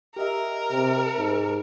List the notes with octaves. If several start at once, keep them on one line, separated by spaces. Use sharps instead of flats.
G4 A#4 D#5 E5
C3
G#2